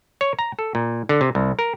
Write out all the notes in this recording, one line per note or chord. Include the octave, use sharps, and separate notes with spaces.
C#5
A#5
A4
A#2
D3
C3
C2
A#4